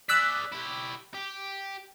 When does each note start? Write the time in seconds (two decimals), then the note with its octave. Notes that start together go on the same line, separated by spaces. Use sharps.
0.09 G#4 D5 E6 F#6 B6
0.52 E4 G4
1.15 G4